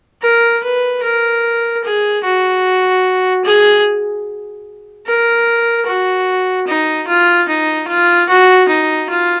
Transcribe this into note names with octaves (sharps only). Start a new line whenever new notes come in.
A#4
B4
A#4
G#4
F#4
G#4
A#4
F#4
D#4
F4
D#4
F4
F#4
D#4
F4